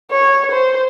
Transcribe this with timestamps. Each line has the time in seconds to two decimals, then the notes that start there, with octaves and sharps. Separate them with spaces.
0.11 C#5
0.51 C5